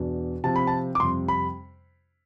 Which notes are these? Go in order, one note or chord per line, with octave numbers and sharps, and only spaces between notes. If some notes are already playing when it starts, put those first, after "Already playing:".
Already playing: E2 B2 B3 D4
C3 F3 C4 A5
B5
A5
D6
F2 C3 G3 C6
B5